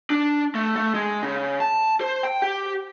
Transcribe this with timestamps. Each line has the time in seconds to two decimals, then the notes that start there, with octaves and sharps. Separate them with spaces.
0.10 D4
0.55 A3
0.76 A3
0.95 G#3
1.23 C#3
1.60 A5
2.01 C5
2.23 G5
2.42 G4